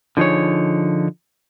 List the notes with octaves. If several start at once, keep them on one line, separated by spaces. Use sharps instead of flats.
D3 F3 D#4 G#4 C#5